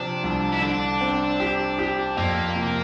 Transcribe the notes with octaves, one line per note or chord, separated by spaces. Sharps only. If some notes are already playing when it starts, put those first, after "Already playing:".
Already playing: C3 F3 C4 D4
C2
E4
D3 D4
C4
G4
G4
F2 A#3
C3